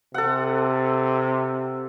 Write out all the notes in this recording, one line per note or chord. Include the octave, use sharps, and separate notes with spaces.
C3 A4 F#5